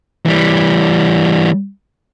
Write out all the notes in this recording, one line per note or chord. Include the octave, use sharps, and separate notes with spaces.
E3 G3